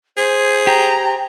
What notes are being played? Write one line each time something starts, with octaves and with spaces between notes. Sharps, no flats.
G#4 C5
G4 A#5